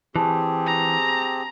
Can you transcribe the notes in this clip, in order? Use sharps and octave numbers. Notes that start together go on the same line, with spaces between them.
E3 C4 G4 G#4 G#5 A5
A#5